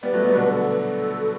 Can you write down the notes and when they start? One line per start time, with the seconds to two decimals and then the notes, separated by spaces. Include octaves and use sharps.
0.03 G3 B3 B4
0.13 F#3 A3
0.24 G3 B3
0.34 B2 D3
0.45 B4
0.49 A4